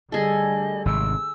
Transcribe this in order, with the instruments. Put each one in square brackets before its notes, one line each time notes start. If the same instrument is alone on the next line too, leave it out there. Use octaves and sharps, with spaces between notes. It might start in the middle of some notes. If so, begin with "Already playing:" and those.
[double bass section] D3 G3 A3 [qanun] G#4 A4 [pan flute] D#5
[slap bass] G#1 C3 [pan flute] E6